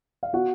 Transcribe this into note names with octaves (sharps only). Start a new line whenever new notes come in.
F5
B3 F#4 F#5